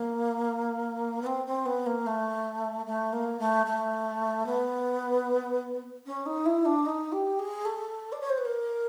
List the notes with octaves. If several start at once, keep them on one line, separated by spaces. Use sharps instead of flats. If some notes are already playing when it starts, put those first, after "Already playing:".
Already playing: A#3
B3
C4
C4
B3
A#3
A3
A3
A#3
A3
A3
B3
C#4
D#4
E4
D4
D#4
G4
G#4
A4
D5
C#5
C5
B4
A#4